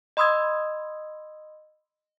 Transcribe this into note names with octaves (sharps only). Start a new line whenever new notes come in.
D#5 B5 C6 D#6 E6 G#6